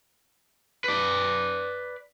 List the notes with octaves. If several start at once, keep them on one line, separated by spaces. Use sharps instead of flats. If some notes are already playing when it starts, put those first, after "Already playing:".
B4 D5